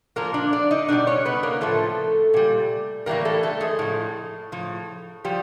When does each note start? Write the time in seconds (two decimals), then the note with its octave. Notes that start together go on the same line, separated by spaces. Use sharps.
0.16 A#2 F3 A#3 A#4
0.34 D4 D5
0.53 D4 D5
0.71 D#4 D#5
0.88 B2 G3 D4 D5
1.07 C#4 C#5
1.25 B3 B4
1.43 A#3 A#4
1.61 A2 F3 A3 A4
2.34 A#2 G3
3.06 A2 E3 G3 A#3 A#4
3.25 A3 A4
3.43 A3 A4
3.61 G#3 G#4
3.79 A2 F3
4.52 A2 F3
5.25 F3 G3 G4